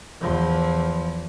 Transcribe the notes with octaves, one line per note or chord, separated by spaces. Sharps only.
E2 F3